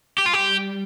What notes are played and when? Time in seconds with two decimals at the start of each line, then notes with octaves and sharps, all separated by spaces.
0.18 G3 G4
0.26 F4
0.33 G4